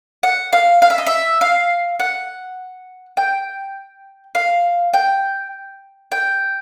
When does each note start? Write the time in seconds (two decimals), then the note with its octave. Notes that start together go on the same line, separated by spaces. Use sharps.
0.23 F#5
0.53 F5
0.82 F5
0.90 E5
0.98 D#5
1.07 E5
1.41 F5
2.00 F#5
3.17 G5
4.35 F5
4.94 G5
6.12 G5